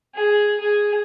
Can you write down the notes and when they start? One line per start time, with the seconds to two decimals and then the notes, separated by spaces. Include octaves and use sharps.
0.15 G#4
0.60 G#4